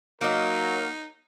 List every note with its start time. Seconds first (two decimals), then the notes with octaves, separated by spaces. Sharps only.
0.21 F#3 A#3 D#4 A#4 D#5